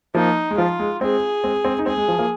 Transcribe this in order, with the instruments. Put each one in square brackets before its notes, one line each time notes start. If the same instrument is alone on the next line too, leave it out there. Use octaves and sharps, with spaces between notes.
[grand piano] F3 A#3 [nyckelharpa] D#4
[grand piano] G#3
[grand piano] F3 [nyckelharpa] F4
[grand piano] G#3
[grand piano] G#3 C4 [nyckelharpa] G#4
[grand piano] G#3 C4
G#3 C4
D#4
[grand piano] G#3 C4 [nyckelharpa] G#4
[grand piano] G#3
F3
F3 A#3